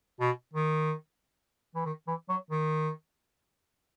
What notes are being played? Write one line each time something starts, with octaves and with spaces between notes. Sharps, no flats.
B2
D#3
E3
D#3
E3
F#3
D#3